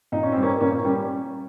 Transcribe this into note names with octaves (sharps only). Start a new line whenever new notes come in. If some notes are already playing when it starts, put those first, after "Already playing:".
A#2 D#4
C#4
C4
G3
A#3 C#4
A#2 A#3 C#4
A#3 C#4
G3 C#4